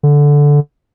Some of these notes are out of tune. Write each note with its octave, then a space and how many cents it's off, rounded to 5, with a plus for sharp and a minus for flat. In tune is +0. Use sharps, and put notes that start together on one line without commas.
D3 -10